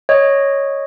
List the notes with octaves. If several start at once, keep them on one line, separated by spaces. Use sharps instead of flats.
C#5 D#5